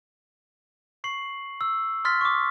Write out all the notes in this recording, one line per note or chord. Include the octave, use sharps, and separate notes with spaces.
C#6 C7 F#7
E6
C6 D#6 F6 A6 B6
C#6 D6